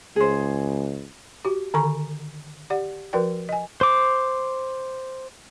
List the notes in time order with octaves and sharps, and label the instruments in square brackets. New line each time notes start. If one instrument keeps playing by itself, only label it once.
[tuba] C#2 [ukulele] G#4 C5
[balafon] F#4 G4
D3 D#3 A4 G#5 A#5 C#6
G4 D5 F#5
F3 F#4 A#4 B4 D5 G5
D#5 G#5
[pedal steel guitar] C5 D6